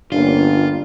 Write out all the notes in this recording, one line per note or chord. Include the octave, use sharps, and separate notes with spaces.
G1 A#3 C#4 D4 F4